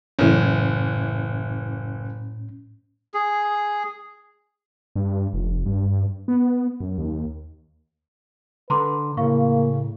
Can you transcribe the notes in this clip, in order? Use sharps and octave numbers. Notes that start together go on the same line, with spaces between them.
F#1 A2 E3 C#4
G#4
G2
F1
G2
B3
F#2
D#2
D3 B4 A#5 C6 D6
A2 C#3 A#3 F5 C#6